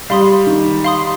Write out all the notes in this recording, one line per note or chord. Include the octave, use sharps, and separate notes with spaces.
G3 F5 C6 D#6
D#3
F5 C6 D#6